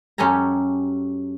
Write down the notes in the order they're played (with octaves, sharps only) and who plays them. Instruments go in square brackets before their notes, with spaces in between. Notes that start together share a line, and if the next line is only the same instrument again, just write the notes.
[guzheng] F#2 C#4 G4 A4 G#5 A#5